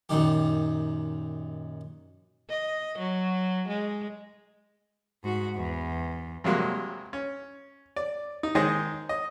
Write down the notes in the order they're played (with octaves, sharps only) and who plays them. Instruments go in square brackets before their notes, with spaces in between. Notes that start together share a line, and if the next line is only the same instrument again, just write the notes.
[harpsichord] F#2 A#2 D#3 G4
[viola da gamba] D#5
F#3
G#3
[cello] G#2 F#4
E2
[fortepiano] G2 C3 F#3 G#3 A#3 F#4
C#4
D5
D#4
D#3 G#3 D#4 G#4 C5 D#5
D#5